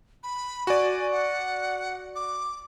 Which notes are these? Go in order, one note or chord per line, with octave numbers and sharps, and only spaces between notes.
B5
F#4 D5 G#5
F#5
D6